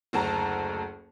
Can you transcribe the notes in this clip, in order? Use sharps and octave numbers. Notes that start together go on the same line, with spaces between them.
F#1 D2 A5 A#5